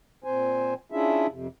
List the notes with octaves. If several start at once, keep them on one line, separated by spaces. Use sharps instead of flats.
A#2 C4 C5 G#5
C#4 D4 E4 F4 G#4 E5
F2 C3